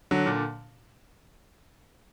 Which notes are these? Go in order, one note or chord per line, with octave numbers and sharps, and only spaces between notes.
D3 F#3
A#2 D3